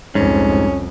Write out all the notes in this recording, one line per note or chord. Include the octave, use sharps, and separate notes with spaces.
C2 F2 G#2 C#4